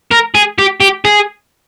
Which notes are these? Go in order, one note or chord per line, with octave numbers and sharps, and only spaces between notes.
A#4
G#4
G4
G4
G#4